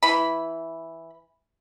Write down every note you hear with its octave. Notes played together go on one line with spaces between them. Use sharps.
E3 B5